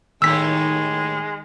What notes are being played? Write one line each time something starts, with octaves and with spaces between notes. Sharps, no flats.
D#2 A2 D#3 G3 G#3 E6 B6